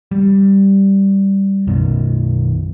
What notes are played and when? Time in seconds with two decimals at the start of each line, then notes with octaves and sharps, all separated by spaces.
0.11 G3
1.67 B1 F#2 B2 D#3